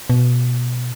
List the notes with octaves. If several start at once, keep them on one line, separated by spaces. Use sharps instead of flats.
B2